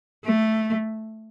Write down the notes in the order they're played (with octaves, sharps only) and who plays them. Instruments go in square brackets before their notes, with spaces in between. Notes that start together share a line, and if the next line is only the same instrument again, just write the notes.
[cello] A3